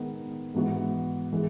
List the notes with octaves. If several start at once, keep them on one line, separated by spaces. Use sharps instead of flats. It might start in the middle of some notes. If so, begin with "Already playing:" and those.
Already playing: D#3 G#3 B3
G#2 E3 B3 F#4
E3 G#3